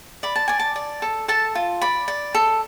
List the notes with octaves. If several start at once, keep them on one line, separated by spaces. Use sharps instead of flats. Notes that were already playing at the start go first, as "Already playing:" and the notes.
D5 B5
A5
D5 G#5
A5
D5
A4
A4 A5
F4
D5 B5
D5
A4